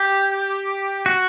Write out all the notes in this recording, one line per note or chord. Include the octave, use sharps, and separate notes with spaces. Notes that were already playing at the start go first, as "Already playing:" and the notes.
Already playing: G4
F#4